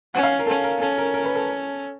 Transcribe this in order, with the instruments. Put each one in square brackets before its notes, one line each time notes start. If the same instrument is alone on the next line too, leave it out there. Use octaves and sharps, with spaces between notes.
[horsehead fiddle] C#4 [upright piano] F#5
[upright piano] F5
A#4
[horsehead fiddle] C#4 [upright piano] A4
[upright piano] A#4
[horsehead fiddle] C#4 [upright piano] A4
[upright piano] A#4
A#4
B4
A4